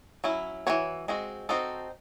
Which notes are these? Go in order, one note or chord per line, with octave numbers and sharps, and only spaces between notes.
F#3 C#4 E4
E3 C4 F#4 C#5
G#3 C4 F#4
C4 D#4 F#4 A4 C5